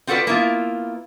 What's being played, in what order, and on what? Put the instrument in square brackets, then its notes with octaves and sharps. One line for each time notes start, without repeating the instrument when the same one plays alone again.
[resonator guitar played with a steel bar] C4 F4 F#4 A4 B4 D5
A#3 B3 E4 F4